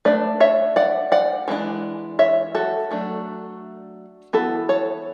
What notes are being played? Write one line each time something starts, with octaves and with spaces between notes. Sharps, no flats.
A3 D4 B4 D5
C#5 E5
D5 F#5
D5 F#5
E3 G#3 B3 D4
C#5 E5
F#4 A4
F#3 A3 D4
E3 B3 E4 F#4 A4
A4 C#5